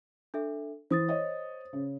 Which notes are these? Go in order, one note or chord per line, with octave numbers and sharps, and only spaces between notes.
D4 A4 E5
E3 C5 D#6 A6
C#5 D#5
C#3